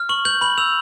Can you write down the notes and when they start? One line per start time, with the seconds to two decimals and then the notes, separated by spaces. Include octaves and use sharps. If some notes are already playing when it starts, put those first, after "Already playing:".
Already playing: F6
0.09 C#6 F#7
0.25 G6 F#7
0.41 B5 F#7
0.58 E6 F7